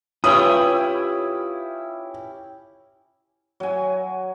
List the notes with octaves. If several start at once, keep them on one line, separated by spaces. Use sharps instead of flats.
C#4 E4 F4 G4 B4 C#5 D#6
F#3 G#5